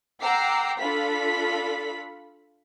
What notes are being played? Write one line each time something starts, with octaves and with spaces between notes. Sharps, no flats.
F#5 G5 A#5 D6 E6 C7
D4 F4 A4 F5 B5 B6